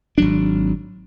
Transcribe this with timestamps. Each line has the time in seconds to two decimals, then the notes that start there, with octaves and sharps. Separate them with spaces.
0.18 G#1 F#3 D4